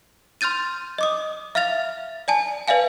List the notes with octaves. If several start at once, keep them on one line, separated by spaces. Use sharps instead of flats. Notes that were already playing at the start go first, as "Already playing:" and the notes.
C6 F6 G6 A6 D#7
D#5 D6 D#6
E5 F5 F6 A6 F7
D5 G#5 A5
B4 D5 E5 F5 G#5